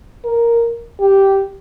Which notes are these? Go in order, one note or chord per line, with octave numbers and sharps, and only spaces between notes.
A#4
G4